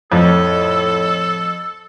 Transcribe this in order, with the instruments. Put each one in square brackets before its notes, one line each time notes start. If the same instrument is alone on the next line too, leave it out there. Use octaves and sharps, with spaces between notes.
[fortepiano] F2 [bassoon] A2 [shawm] A4